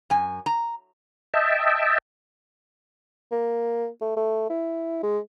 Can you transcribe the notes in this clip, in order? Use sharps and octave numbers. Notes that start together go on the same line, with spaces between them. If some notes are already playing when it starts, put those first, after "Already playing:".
F#2 G#5
A#5
D#5 E5 G5 A5
A#3
A3
A3
E4
G#3